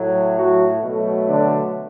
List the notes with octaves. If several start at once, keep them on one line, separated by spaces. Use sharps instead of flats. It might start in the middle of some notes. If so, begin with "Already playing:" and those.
Already playing: A2 F#3 A3
F#3 F#4
B2 F#3 A3
D3 D4